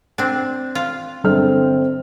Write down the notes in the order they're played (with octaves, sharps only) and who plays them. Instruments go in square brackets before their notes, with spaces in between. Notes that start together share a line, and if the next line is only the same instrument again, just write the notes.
[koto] C4 D4
F4
[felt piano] G1 A4 F6 [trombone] C4